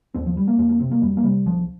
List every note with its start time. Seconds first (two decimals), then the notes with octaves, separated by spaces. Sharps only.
0.14 D#2 C4
0.26 F3
0.37 G3
0.48 A#3
0.58 F2 A#3
0.69 A#3
0.80 C3 C4
0.91 A#3
1.02 F2 G3
1.17 A#3
1.23 C3 G3
1.46 C2 F3